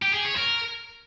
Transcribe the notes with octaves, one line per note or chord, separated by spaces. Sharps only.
G4
G#4
C#5
A#4